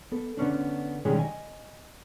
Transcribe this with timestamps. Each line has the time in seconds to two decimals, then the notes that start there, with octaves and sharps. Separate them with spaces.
0.12 B3 A4
0.37 D3 B3 C#4 D4
1.05 B1 D#3 G3 G#3 C#4 G#4
1.19 D#5 G#5